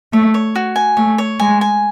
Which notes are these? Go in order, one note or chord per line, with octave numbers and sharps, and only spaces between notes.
A3 C#5
C#5
F#4
G#5
A3 C#5
C#5
G#3 G#5
G#5